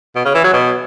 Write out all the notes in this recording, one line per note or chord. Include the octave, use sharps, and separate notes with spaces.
B2
C#3
E3
F#3
B2